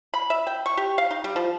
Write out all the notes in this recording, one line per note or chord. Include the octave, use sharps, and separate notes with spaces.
B5
E5
G5
C#6
G4
F5
D#4
G3
F3